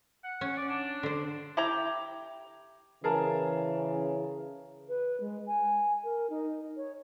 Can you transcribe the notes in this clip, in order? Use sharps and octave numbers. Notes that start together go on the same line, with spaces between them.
F#5
C#4
D5
D4
D3 C5
E4 G4 A#5
C#3 E3 G#4 A#4 A5
B4
G#3
G#5
A#4
D#4
C#5